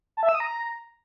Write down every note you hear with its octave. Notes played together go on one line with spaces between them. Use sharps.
A5
E5
E6
D#6
A#5